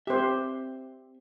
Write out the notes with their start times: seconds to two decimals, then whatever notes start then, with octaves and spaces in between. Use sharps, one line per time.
0.07 C4 G4 C5 E5